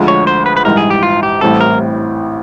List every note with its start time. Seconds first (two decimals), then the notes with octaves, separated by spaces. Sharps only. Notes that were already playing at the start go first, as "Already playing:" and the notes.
Already playing: D2 D3 F3 G#3
0.08 C#5
0.27 C5
0.46 B4
0.57 B4
0.65 A#1 G#2 E3 G3 A#4
0.77 G#4
0.90 G4
1.03 F4
1.23 G4
1.41 A1 A2 E3 G3 C4 A4
1.61 A#4